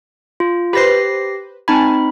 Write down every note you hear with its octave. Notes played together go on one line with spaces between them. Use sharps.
F4
G4 B4 C5 A#6 C7
C4 D#4 G#5 A5 B5